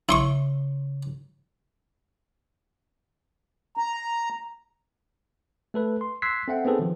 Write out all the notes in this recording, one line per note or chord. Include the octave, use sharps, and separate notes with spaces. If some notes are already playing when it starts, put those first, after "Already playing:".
C#3 E4 C6 C#6
A#5
A3 A4 B4
C6
C6 E6 F#6 G#6 B6 C7
C4 A4 E5 F#5 G5
B3 C4 D#4 G#4 A4 B4
D#3 F3